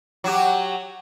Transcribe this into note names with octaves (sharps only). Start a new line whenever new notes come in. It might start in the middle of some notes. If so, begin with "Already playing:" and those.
F#3 F#4 G4